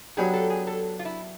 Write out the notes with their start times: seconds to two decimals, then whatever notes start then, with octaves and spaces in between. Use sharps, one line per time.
0.17 F#3 B3 D4 G4 G#4
0.33 A4
0.50 G#4
0.67 A4
0.99 F4
1.05 E4